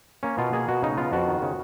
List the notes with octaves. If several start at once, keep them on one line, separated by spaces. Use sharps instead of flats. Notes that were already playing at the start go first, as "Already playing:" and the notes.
A#3 C#4
B2 F4
A#3 G#4
B2 F#4
C#3 D#4
B3 F4
F2 F#4
D#3
C#3